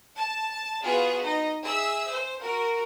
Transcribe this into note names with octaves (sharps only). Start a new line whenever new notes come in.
A5
B3 F4 F#4 G#4
D#4 D#5
G#4 E5 E6
C5
F#4 A#4